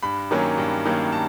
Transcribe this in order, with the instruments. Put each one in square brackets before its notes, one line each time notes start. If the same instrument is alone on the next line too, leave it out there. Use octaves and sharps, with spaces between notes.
[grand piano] G2 B5
D#3 F#3 A#3 C#4
G2
D#3 F#3 A#3 C#4
A5